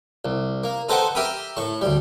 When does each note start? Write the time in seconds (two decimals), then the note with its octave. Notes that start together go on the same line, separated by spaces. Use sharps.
0.25 C2
0.64 A#3
0.89 D#4 A4 B4 C5 F#5 G5
1.15 G4 A#4 E5 G5 B5 D#6
1.57 A2 C#6
1.81 D2 G3